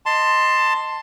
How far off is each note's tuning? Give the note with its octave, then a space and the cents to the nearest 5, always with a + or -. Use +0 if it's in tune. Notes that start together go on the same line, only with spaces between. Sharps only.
D#5 +0 A5 +15 C6 +0